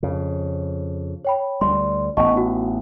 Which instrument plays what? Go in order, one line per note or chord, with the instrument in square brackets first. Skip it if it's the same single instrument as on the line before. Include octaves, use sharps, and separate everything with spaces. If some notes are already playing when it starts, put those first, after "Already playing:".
[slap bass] F2 C#3
[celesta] C#5 G5 B5
[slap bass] D2 G3 [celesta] C6
[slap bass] A1 B3 [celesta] D#5 A5 C#6
[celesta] D#4 F#4